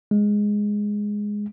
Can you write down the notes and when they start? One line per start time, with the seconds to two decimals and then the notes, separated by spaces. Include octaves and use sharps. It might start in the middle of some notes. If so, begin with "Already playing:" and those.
0.11 G#3